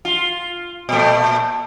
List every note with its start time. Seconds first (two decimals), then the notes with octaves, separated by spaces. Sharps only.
0.05 F4
0.89 A#2 A3